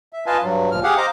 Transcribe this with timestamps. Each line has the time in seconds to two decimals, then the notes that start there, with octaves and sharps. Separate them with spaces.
0.13 E5
0.26 F4 B4 D#5 F5 G#5 A5
0.43 G2 F#3
0.72 D2 A#2 F3 F6
0.83 G4 G#4 F5 F#5
0.98 C5 D#5 F5 A#5 D6